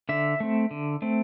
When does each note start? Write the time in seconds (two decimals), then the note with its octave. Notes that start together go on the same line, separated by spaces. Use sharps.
0.09 D3 E5
0.40 A3 C4
0.71 D3
1.02 A3 C4